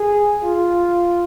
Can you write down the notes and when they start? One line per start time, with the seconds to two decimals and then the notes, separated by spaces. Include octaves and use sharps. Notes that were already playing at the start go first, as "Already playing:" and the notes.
Already playing: G#4
0.43 F4